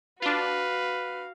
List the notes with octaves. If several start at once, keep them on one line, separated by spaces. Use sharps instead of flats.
D4 F4 F#4 B4 F5